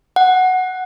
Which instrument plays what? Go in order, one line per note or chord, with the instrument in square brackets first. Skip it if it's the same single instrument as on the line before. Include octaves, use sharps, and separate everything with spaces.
[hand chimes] F#5